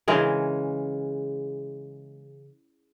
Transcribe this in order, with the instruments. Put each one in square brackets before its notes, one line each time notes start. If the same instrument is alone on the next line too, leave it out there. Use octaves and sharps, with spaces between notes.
[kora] C#3 E3 G#3 A#4